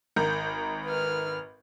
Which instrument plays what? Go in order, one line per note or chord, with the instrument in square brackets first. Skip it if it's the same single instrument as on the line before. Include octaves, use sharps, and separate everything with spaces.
[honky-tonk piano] G#1 A#4 G6
[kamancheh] B4 F6